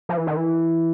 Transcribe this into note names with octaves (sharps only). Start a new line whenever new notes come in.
F3
E3
D#3
E3